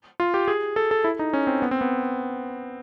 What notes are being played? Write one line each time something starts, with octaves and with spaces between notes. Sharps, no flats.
F4
G4
G#4
A4
A4
E4
D#4
C#4
C4
B3
C4
B3